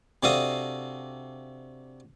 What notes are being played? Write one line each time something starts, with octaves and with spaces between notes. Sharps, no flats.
C3 D4 F#4 A4 F5 D#6